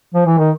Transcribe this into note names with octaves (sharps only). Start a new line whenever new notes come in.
F3
E3
D#3